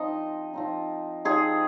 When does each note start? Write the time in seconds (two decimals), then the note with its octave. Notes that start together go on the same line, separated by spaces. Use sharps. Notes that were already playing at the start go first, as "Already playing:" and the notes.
Already playing: F3 C4 D#4 D#5
0.54 F3 C4 D#4
1.25 F3 C4 D#4 G#4